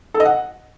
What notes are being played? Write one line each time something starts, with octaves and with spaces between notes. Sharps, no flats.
A4
D#5
F#5